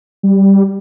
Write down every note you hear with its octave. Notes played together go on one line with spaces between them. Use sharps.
G3